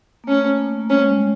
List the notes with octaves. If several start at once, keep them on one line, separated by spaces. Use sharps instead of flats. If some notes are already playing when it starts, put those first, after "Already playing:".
A#3
A3 C#4
A#3
A#3
A3
G3 C#4
G#3
G3